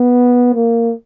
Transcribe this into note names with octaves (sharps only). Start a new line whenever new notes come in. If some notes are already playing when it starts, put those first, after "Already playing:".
Already playing: B3
A#3